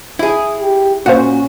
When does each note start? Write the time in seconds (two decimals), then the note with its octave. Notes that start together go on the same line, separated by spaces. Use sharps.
0.19 E4 G#4
0.60 G4
1.06 A#2 C#4 F#4 C5 F5 F#5